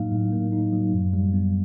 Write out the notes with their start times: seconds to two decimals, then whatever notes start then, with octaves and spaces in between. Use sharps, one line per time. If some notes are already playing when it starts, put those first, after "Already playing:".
Already playing: A2 F#3 A#3 D#4 F5
0.12 A2
0.32 A#3
0.52 D#4
0.73 F#3
0.93 F#2
1.13 G3
1.33 B3